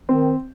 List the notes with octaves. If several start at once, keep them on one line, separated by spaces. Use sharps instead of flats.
D#3 C4